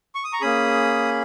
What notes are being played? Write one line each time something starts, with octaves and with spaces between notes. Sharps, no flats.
C#6
D#6
A#5 C#6
A#3 C#4 G#4 B5 D#6